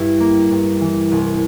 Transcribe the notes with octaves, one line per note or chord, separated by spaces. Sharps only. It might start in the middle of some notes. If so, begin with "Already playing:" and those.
Already playing: G2 E4
A#3
G2
E3
C2